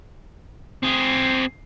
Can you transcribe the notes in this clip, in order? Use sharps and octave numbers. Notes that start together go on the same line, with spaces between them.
C4 G#4